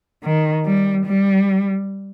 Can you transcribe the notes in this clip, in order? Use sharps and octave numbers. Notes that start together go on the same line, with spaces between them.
D#3
G3
G3